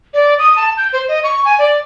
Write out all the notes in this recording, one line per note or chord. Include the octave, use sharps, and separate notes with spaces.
D5
D#6
A5
G6
C5
D#5
C#6
G#5
D5